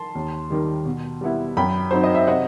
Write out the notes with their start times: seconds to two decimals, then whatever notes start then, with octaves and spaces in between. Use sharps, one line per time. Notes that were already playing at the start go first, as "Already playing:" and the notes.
Already playing: A5 C6
0.15 D#2
0.50 D#3 G3
0.86 B2
1.21 G3 B3 E4
1.57 F#2 G5 B5
1.91 F#3 C4 D#4 C5
2.04 D#5
2.15 E5
2.27 C3 D#5 F#5